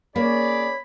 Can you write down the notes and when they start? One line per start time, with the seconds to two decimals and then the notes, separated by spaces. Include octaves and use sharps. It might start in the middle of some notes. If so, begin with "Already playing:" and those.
0.16 A#3 C#4 G#4 C#5 D5 B5